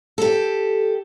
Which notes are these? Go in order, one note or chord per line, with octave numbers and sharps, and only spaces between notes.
G4 A4